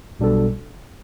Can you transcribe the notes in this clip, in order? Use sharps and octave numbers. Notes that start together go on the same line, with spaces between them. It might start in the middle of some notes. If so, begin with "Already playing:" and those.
B1 B2 G3 D4 A4